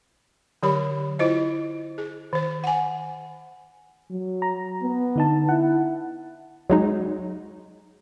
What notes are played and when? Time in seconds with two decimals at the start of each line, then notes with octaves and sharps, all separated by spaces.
0.63 D3 F#3 G4 C#5 B5
1.19 E4 F4 C5 D#5
1.98 G#4
2.33 D#3 C5
2.64 F#5 G#5
4.10 F#3
4.42 A#5
4.82 B3
5.16 D3 D#4 A5
5.49 E4 F#5
6.70 F#3 G#3 D#4